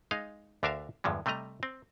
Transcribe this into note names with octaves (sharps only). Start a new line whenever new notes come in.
G#3 D#4 D#5 F5
D2 D3 D4 A#4 E5 F5
E2 G2 D3 F3 G#3
C3 G3 A3 D#5 A#5
C4